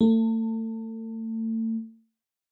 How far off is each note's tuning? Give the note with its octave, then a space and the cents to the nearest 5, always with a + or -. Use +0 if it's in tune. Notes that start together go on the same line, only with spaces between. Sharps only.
A3 +35